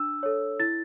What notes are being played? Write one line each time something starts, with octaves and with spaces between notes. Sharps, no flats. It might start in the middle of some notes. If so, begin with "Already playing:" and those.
Already playing: D4 E6
A4 C#5
E4 A6